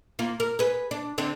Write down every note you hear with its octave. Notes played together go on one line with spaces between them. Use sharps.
A#3 F4
A#4
G#4 B4
D4
D3 C4 D4